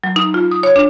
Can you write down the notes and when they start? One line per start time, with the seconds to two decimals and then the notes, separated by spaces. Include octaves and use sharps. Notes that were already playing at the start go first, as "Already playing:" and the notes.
0.04 F#3
0.16 D#4
0.34 F4
0.51 D#6
0.63 C#5
0.76 D4